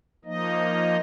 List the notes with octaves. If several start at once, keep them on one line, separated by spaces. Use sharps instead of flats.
F3 A#3 D#4 D#5